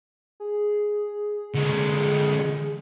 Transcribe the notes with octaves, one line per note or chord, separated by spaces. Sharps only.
G#4
D3 G#3